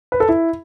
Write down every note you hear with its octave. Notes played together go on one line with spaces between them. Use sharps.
B4
A4
E4